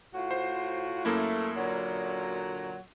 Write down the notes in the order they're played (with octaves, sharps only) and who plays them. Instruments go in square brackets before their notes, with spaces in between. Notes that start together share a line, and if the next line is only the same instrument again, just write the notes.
[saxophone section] A2 F4 F#4
[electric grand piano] C5
[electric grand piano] F#2 A#3 E4 [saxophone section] A3
[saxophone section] A#2 D3 F#3